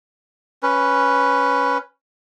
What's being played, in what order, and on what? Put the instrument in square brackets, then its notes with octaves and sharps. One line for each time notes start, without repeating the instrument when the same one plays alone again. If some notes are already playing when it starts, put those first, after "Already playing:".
[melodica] C#4 B4